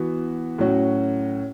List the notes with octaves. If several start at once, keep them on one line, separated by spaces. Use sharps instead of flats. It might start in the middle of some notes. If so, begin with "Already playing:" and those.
Already playing: E3 B3 F#4
A2 F#3 C#4 F#4